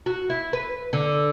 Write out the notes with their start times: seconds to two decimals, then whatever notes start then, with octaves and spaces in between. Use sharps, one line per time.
0.06 F#4
0.30 E4
0.53 B4
0.93 D3